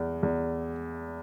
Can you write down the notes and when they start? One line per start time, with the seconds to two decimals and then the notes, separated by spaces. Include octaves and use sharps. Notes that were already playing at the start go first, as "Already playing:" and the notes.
Already playing: E2
0.23 E2